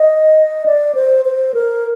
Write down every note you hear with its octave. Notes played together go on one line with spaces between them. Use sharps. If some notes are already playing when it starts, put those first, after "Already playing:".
Already playing: D#5
D5
C5
C5
A#4